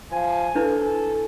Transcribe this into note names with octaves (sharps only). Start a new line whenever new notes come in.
F3 G#5
D4 E4 A4 B4